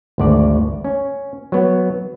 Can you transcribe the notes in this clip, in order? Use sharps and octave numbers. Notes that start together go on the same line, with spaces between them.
G#1 D2 D5
C#4
F#3 B3